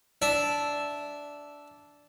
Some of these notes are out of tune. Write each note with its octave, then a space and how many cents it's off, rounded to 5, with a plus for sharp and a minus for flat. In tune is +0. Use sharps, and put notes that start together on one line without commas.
D4 -10 E5 +0